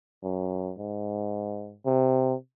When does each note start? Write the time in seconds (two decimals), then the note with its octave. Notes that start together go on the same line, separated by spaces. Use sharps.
0.23 F#2
0.78 G#2
1.86 C3